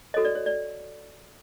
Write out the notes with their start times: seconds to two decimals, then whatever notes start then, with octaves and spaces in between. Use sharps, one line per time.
0.14 F#4 A4 C#5 D#5
0.25 D5
0.35 C#5
0.46 D5